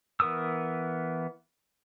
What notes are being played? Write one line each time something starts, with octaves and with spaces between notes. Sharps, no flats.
E3 B3 A#4 D#6 E6